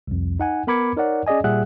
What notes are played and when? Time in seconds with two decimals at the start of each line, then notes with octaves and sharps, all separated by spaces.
0.08 C2 F2
0.40 D#4 F#5 G#5
0.67 B3 A#4 B5 D6 G#6 C#7
0.96 D#4 A#4 C#5 D5 F#5
1.27 C#4 G#4 D5 D#5 G#5
1.44 A#2 G3 G#4 E5 F#5 F#6